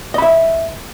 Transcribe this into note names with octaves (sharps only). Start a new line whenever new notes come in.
D#5 E5 B5